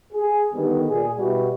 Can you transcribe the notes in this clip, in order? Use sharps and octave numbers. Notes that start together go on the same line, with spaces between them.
G#4
D3 D#3 G3 B3
A#2 G#4
B2 G3 B3 E4 F#4